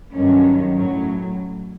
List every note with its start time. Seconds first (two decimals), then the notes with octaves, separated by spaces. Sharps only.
0.15 G2 D#3 F#3 C#4
0.76 A2 F#3 C#4